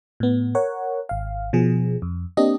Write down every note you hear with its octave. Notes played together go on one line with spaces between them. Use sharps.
A2 B3
A#4 C#5 F#5
G#1 F5
B2 F3 G#4
F2
A#3 C4 D4 G4 D#5